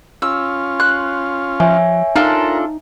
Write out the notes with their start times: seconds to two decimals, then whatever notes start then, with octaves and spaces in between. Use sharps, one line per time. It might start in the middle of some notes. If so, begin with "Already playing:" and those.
0.22 C#4 F4 E6
0.80 C6 F#6
1.60 F3 C#5 E5 G#5
2.16 D4 D#4 F4 A4 A#4